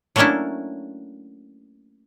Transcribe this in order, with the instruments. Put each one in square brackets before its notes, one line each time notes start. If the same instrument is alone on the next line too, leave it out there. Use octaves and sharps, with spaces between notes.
[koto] F#3 A3 A#3 C#4 D4 E4